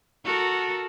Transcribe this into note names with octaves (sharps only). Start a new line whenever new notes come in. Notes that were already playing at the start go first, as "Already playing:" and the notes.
F#4 A4 A#4